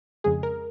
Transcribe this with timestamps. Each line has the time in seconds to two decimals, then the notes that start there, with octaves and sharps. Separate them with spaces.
0.24 F2 C#3 G#3 G#4
0.43 A#4